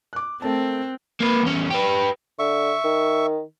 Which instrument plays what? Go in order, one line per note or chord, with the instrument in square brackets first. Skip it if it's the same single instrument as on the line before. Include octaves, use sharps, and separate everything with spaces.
[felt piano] D6 F#6
[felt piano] A3 A#4 A5 [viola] C4
[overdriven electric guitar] A#3 B4
E2 C#4
G4 B4
[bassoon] D3 [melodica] E5 C#6
[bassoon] D#3